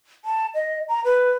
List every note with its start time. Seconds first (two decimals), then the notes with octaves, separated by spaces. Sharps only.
0.25 A5
0.55 D#5
0.88 A#5
1.05 B4